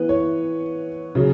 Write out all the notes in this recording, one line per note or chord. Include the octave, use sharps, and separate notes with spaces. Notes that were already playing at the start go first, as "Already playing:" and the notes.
Already playing: E3 B3 B4
C#5
C#3 F#3